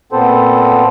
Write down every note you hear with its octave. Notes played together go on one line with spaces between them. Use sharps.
A#2 B3 C4 A4 C5